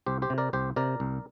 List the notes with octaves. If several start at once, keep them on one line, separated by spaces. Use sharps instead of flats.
C2 G4 C5
G4 C5
C3
A#4 D5
C2 G4 C5
C3 A#4 D5
C2